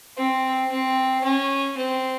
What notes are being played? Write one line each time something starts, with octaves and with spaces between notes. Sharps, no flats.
C4
C4
C#4
C4